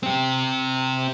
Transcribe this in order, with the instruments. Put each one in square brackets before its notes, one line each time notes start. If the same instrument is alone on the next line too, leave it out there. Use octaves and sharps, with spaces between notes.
[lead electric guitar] C4 G4